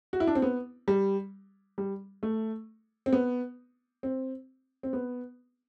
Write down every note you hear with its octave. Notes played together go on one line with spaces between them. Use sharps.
F#4
E4
D4
C4
B3
G3
G3
A3
C4
B3
C4
C4
B3